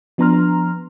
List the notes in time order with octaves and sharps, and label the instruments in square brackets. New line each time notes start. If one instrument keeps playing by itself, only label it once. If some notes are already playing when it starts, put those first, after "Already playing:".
[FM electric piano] F3 B3 D4 A#5 C6 F6